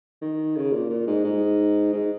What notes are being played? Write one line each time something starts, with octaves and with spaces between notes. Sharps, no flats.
D#3
C#3
A#2
A#2
G#2
G#2
G#2